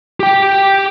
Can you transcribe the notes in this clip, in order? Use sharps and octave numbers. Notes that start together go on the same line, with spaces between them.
G4 G5